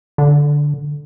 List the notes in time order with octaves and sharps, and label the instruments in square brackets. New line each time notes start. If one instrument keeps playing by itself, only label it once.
[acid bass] D3